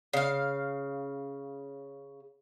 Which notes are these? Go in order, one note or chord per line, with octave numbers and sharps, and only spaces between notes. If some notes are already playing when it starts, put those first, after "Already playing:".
C#3 F5